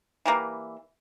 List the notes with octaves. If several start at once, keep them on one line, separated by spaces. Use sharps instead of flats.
E3 G3 A#3